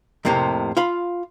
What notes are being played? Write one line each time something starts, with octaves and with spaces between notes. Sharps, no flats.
F2 A2 C3 A#3 C4
F4 F5 B5